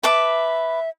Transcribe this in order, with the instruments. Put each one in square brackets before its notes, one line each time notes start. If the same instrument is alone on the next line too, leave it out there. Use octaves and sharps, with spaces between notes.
[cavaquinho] B4 A5 D6 [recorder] E5